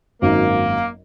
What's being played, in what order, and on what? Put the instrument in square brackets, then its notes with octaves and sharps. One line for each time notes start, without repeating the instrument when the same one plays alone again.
[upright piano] G#1 F#2 F#3 D#4 A#4 [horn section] A#3